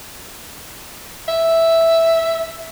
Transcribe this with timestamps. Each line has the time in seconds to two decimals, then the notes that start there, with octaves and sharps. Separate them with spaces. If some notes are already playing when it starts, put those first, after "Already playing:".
1.28 E5